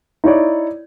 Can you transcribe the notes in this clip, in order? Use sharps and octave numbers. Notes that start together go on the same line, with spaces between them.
D#4 E4 C#5 D5